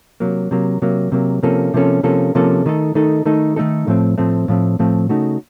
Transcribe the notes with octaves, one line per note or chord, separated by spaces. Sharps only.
C3 F#3 A#3
C3 F#3 A#3
C3 F#3 A#3
C3 F#3 A#3
C3 F3 A#3 C#4 A4
C3 F3 A#3 C#4 A4
C3 F3 A#3 C#4 A4
C3 F3 A#3 C#4 A4
D#3 A3 D#4 A4
D#3 A3 D#4 A4
D#3 A3 D#4 A4
D#3 A3 D#4 A4
A2 F3 A3 C4
A2 F3 A3 C4
A2 F3 A3 C4
A2 F3 A3 C4
C#3 A3 D#4 F#4